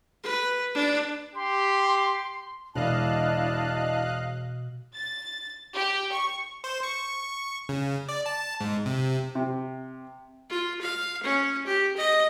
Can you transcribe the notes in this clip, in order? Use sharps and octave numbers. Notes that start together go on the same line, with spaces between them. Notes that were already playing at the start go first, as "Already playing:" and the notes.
B4
D4
G4 C6
E1 B2 D4 E4 D#5 F5 A5 F#6
A6
G4
C#6
C5
C#6
C#3
D5
A5
G#2
C3
C3
F4
F5
C#4
G4
D#5